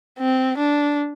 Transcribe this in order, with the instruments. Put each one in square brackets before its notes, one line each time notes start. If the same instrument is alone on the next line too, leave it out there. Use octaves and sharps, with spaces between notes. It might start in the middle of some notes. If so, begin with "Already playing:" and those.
[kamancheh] C4
D4